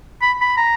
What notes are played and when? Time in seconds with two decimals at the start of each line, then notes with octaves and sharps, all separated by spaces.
0.22 B5
0.41 B5
0.57 A#5